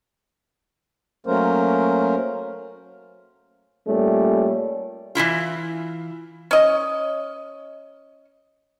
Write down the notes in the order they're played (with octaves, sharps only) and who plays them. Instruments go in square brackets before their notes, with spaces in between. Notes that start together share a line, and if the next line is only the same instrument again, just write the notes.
[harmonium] F#3 A3 A#3 C#4 A#4 C5
[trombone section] A#2 G3 A3 C#4
[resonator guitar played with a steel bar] E3 C4 E4 F4
[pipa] C#4 D#5